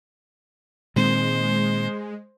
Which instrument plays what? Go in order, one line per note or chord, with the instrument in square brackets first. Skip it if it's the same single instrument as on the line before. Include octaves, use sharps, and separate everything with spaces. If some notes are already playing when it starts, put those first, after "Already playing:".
[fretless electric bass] A#2 D#3 C4 [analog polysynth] G#3 [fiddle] C5